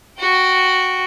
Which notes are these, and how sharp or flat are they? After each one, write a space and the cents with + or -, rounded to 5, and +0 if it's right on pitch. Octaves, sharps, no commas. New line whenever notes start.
F#4 +0 G5 -15